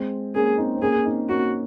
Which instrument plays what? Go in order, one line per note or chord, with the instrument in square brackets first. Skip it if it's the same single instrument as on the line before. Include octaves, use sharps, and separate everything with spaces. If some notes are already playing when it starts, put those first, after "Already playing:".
Already playing: [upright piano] G#3 C4
[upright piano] A#3 C#4 [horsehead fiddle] G#4
[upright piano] C4 D#4
C4
[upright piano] A#3 C#4 [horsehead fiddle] G#4
[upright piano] C#4
C4 D#4
[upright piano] A#3 C#4 [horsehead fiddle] F#4